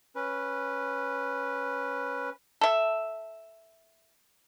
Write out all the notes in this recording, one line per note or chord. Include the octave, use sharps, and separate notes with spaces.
C#4 B4
A4 E5